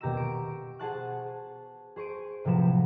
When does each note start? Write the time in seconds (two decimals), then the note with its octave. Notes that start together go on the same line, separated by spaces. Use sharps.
0.01 D#1 B2 G4 A#5 E6 E7
0.17 C#6 D7
0.79 G#4 C5 F#5 A5 C#6 F#6
1.96 G#4 C5 C#6 D7 D#7
2.45 A2 C3 F3 F#3 B4 E7